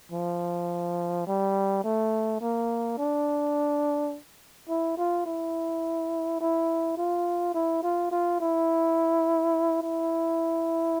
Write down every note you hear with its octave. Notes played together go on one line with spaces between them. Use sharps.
F3
G3
A3
A#3
D4
E4
F4
E4
E4
F4
E4
F4
F4
E4
E4